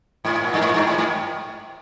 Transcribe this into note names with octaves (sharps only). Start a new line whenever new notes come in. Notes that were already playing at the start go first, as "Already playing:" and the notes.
G#2
A#2
G2
G#2
G2
G#2
G#2